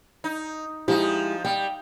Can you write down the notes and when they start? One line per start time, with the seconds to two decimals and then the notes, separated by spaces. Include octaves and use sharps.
0.24 D#4
0.88 F3 G#3 D#4 E4 G4
1.45 G3 G5